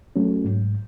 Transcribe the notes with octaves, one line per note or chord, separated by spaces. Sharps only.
F#3 A3 C#4
G#2